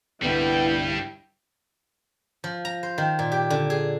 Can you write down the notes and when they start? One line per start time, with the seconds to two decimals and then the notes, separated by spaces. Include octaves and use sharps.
0.23 C2 G2 D3 G3 B3 E4 G5
2.44 F3
2.65 A#5
2.83 C5
2.98 D#3
3.19 A#2
3.32 G4
3.50 D3
3.70 G#4